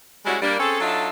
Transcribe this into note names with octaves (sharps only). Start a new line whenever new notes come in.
G3 G#3 C#4 E4 F#4
G3 A#3 D4
C4 C#4 G#4 A4
F#3 D4 D#4 F4 A4 E5